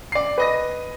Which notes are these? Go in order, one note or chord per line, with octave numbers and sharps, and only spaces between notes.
D5 C7
B4 D#5 A#6